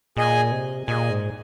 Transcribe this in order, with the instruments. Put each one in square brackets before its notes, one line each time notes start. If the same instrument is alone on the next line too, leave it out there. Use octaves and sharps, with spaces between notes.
[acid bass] A#2 [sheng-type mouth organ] G#4 D#5 G#5
[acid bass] C3
[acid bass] A#2 [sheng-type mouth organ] G#4 D#5 G#5
[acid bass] G#2